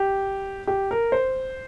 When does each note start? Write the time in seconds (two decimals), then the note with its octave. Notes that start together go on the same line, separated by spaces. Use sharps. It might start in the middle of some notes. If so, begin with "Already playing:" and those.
Already playing: G4
0.67 G4
0.91 A#4
1.12 C5